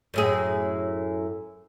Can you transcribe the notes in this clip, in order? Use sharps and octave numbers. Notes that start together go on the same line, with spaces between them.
F#2 A2 G#4